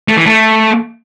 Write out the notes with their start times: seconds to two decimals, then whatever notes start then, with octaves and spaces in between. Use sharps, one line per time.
0.08 A3
0.17 E3
0.26 A3